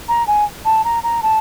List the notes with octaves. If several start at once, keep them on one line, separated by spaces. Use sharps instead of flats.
A#5
G#5
A5
A#5
A#5
A5